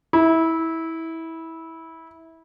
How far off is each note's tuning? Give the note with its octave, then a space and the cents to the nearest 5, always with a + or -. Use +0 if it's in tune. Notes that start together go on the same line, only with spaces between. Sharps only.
E4 -20